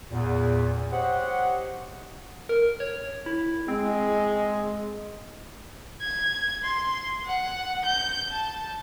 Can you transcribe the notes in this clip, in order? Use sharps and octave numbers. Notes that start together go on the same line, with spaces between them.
E2 A#2
G4 C5 C#5 D#5 F#5
A#4
C#5
E4
G#3 C4
G#6
C6
F#5
G6
A5